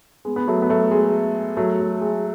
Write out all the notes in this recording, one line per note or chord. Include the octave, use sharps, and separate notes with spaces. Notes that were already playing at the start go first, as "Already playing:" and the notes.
G#3 B3
B3
F#3 A3
B3
F#3 A3
G#3
F#3 A3
F#3
G#3